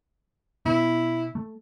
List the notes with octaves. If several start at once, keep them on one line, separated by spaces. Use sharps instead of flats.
B2 B3 E4
A3